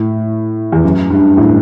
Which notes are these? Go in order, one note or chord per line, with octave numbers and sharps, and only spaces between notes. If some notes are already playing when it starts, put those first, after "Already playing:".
Already playing: A2
E2
F#2
G2
A2